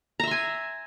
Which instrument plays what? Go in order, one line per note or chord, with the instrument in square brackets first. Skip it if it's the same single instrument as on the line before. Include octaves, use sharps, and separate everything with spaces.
[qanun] A#5
E5
C6
G#5